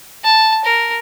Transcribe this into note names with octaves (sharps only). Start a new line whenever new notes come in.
A5
A#4